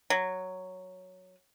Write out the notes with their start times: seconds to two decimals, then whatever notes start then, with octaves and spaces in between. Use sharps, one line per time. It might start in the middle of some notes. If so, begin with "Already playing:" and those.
0.10 F#3